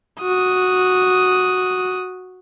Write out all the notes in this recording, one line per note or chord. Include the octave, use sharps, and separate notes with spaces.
F#4 D#6